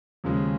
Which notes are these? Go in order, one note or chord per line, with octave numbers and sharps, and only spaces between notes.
D#2 C#3 F3 G#3